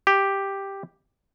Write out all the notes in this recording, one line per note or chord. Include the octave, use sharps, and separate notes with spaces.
G4